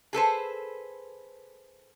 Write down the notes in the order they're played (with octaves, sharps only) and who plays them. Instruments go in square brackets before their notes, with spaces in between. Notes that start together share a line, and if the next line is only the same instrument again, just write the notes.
[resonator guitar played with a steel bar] G#4 A4 B4 C5